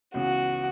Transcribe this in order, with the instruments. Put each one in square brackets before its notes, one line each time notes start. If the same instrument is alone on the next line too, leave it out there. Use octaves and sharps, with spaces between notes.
[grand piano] C#2 C#3 E3 B3 [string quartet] F#4